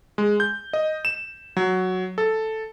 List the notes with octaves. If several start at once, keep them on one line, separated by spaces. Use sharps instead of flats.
G#3
G6
D#5
E7
F#3
A4